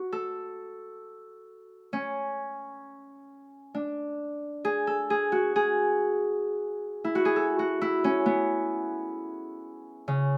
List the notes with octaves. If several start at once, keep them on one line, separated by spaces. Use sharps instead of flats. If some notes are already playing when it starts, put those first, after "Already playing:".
Already playing: F#4
A4
C#4
D4
G#4
A4
G#4
F#4
G#4
E4
F#4
G#4
A4
F#4
E4
C#4
B3
C#3